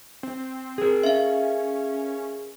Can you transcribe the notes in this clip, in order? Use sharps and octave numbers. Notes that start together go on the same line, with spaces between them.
C4
G#4 A#4
C#4 E5 F5